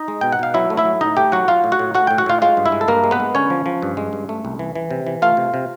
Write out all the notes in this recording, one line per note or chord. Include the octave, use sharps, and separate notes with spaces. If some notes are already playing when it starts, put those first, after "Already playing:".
Already playing: D#4 D#5
G#3
B2 G5
F#5
B2 F5
F#3 E4 E5
A3
E4 E5
F#3
A2 D#4 D#5
A3 G4 G5
F#3 F#4 F#5
F#3 F4 F5
A2
F#4 F#5
A2
A3 F#4 F#5
A2 G5
F#4 F#5
A2 F4 F5
G#3 F4 F5
G2
E4 E5
G#3
A4
G2 A#3 A#4
G#3
B3 B4
G#3
D3 C#4 C#5
F3
F3
G2
G#3
G2
A3
C2
E3
E3
C3
E3
A3 F4 F5
C3
C3